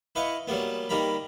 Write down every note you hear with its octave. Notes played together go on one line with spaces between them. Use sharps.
E4 B4 D#5 F5 C#6
F#3 G3 A#3 B3
D#3 G3 A#3 A#5 B5